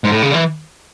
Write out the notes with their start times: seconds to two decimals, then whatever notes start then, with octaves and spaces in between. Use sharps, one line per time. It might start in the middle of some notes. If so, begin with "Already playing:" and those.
0.04 G#2
0.11 A2
0.22 C#3
0.30 D3
0.34 E3